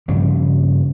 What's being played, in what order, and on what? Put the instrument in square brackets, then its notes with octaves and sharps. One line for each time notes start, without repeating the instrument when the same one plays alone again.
[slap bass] G2 C#3 F3 G3